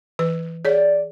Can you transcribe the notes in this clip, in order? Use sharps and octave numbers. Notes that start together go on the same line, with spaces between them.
E3 B4
G#4 C#5 D5